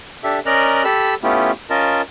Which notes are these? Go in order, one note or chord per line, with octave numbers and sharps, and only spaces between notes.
D4 G4 A4 E5
C#4 A#4 D5 D#5 A#5 F#6
G4 A4 B5 E6
A3 B3 C#4 E4 F4 G4
C#4 F4 A#4 D#5 A5